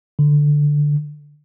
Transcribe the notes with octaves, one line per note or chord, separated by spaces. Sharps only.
D3